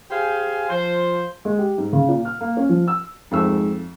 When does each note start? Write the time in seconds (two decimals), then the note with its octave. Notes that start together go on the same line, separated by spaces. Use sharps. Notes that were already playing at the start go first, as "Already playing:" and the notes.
0.11 G4 G#4 C5 F5 G#5
0.70 F3 C5
1.45 G#3
1.58 G4
1.78 G#2
1.92 C#3
2.08 A#2
2.25 F6
2.41 A#3
2.57 C#4
2.69 F3
2.88 E6
3.31 F2 G#2 A3 E6